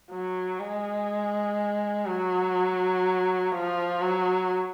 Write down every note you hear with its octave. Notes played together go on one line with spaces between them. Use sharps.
F#3
G#3
F#3
F3
F#3